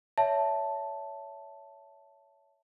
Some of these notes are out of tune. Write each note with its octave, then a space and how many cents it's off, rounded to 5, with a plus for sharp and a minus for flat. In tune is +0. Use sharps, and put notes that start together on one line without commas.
C#5 +20 E5 +0 A5 +0